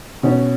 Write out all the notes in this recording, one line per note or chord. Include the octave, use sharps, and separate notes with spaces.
B2 C#4